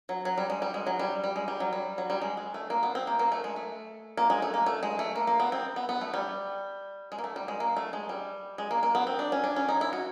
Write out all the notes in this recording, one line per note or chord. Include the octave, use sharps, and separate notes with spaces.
F#3
F#3
G3
G#3
G3
G#3
F#3
G3
G3
G#3
G3
F#3
G3
F#3
G3
G#3
G#3
A3
A#3
B3
C4
A#3
A#3
A3
G#3
A3
A#3
G#3
A3
A#3
A3
G#3
A3
A#3
A#3
B3
C4
B3
B3
A3
G3
G#3
A#3
A3
G3
G#3
A#3
A3
G#3
G3
G#3
A#3
A#3
B3
C4
D4
C#4
D4
C#4
D#4
E4
F#4